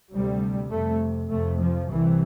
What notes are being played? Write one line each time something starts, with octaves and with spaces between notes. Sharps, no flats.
D2 C3 G3
F2 C3 A3
F2 C3 A3
F3
C2 C3 E3